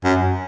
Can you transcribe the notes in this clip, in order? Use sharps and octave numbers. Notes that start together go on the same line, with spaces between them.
F#2